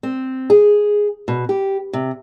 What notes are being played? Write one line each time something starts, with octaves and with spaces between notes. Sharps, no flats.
C4
G#4
B2
G4
C3